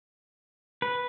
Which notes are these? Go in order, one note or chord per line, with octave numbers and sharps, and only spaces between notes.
B4